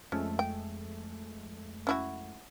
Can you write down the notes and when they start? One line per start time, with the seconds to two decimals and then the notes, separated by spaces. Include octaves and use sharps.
0.12 F2 G#3 A3 C#4
0.39 G5
1.87 C#4 E4 F#4